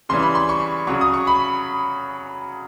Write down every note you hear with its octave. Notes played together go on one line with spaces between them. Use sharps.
C#3 E3 G3 C6
B5
C6
C#6
C#3 F#3 C#6
D#6
C#6
B5